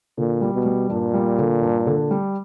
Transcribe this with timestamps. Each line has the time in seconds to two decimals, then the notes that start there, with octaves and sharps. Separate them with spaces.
0.17 A#2 D3
0.42 G3
0.54 B2
0.65 G3
0.89 G2 A#2
1.14 G3
1.38 D3
1.62 G2
1.86 D3
2.11 G3